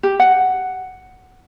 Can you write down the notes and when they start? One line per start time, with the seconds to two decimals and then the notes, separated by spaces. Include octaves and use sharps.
0.03 G4
0.20 F#5